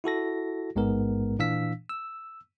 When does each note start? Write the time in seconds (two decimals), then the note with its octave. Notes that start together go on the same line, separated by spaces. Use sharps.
0.04 E4 F#4 A4 A#6
0.76 A1 G#2 G#3 B3 A#4
1.39 A#2 E3 D4 F5 E6 B6
1.89 E6